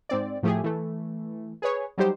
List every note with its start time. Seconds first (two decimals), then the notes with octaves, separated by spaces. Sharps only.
0.09 G#2 C4 D5
0.43 A2 F3 A3 G4 G#4
0.64 E3 A3
1.62 G#4 B4 C#5
1.98 F#3 G3 D#4 G4 C5